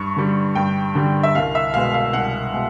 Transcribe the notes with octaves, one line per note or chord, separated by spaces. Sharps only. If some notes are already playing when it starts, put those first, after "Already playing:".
Already playing: G2 C#6
D3 G3
G2 G5
D3 G3
E5
C2 F5
E5
B2 G#3 B3 F5
F5
C2 F#5
B2 G#3